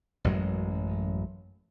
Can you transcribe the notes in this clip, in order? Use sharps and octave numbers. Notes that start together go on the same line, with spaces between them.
A1 F#2 F#3 G#3